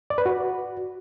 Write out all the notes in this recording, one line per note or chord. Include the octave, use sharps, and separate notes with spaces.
D5
B4
F#4